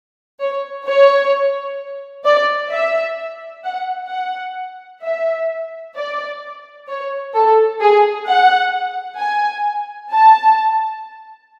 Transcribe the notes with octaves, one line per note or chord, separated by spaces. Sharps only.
C#5
C#5
D5
E5
F#5
F#5
E5
D5
C#5
A4
G#4
F#5
G#5
A5